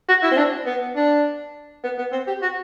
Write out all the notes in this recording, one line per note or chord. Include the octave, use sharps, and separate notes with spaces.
F#4
E4
C4
D4
B3
D4
B3
B3
C4
G4
F#4